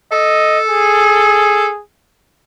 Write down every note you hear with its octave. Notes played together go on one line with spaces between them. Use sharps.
A4 D#5
G#4